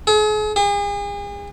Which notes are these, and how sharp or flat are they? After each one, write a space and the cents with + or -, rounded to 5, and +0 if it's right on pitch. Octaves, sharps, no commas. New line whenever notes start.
G#4 +40
G#4 -40